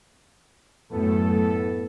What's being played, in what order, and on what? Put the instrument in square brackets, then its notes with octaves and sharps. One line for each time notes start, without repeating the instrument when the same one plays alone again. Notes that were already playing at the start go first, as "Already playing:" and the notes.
[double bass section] F#2 A3 [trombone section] A2 B3 A4